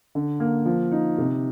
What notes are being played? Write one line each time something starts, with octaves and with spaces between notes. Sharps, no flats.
D3
A#3
F3
D#4
C3